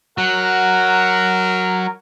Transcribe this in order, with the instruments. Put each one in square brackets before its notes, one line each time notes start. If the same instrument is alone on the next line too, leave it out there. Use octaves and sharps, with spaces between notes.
[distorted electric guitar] F#3 [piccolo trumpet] A#4 [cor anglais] F#5